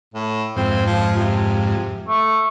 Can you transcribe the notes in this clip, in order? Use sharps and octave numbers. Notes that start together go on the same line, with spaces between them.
A2
F2 G#2 C4
F3
C3
A3